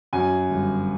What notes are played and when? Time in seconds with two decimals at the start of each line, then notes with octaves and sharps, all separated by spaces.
0.13 F#2 G#5
0.49 G1